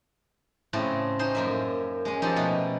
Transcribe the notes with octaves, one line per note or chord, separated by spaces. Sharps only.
A2 C#3 A3 C4
C#4 D#4 C5 C6
F#2 A#3 E5
G#3 C#4
F3 G#3 D#4 G4 A4
B2 A3